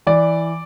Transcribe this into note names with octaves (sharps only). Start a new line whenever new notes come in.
E3 D5